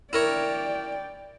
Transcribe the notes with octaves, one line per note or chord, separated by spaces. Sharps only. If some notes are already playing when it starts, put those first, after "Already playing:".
E4 A#4 C#5 D5 G5